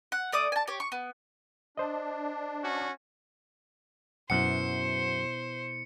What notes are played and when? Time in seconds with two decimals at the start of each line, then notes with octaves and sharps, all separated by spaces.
0.12 F#5
0.32 A3 D5 D#6
0.52 G#5 A5
0.68 G4 C#5
0.80 C#6
0.92 B3
1.77 D4 C5 D#5
2.62 C#4 F#4
4.30 F#2 B2 B3 E4 C5 F#5 C#7